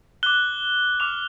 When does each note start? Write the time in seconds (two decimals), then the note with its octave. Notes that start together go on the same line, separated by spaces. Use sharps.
0.23 D6 F#6 G7
1.00 D6 F6 F7